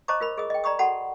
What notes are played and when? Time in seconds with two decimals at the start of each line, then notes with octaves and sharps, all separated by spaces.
0.08 C5 D#5 A5 A#5 C#6 D6
0.21 F4 A#4 B5
0.38 G#4 A#4 D#5 D#6
0.50 D#5 G5
0.64 D5 A#5 B5 C#6 D#6
0.79 F#4 A4 F#5 A5 B5